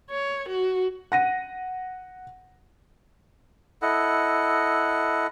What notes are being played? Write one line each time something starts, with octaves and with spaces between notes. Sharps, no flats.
C#5
F#4
F#5 A#6 D#7
E4 A4 D#5 F#5